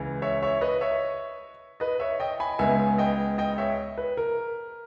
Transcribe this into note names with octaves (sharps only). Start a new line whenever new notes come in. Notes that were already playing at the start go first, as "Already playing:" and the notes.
Already playing: C#2 C#3 E3
C#5 E5
C#5 E5
B4 D#5
C#5 E5
B4 D#5
C#5 E5
D#5 G5
G#5 B5
C#2 C#3 G#3 B3 E5 G#5
D#5 G5
D#5 G5
C#5 E5
B4
A#4